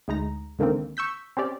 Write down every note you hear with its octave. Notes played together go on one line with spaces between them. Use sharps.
D2 G#3 D#4 A#5
C#2 D3 D#3 A#3 C4
C#6 E6 G6 B6
C4 C#4 G4 D5